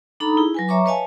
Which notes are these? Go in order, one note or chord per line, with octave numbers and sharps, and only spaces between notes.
D4 D#4 A4 A#5 B5 D#6
E4 G#4
F#3 B4 G#5
C#5 E5 A#5 C#6 D6
B4 C#5 D#5 F5 G#5 A5